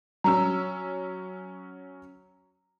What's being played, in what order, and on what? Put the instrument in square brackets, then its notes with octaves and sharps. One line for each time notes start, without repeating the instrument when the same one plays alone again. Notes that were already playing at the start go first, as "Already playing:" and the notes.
[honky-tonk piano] F#3 C#4 E6 [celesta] A#5